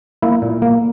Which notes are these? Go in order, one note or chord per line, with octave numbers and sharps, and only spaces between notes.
A#3 E4
A#2
A#3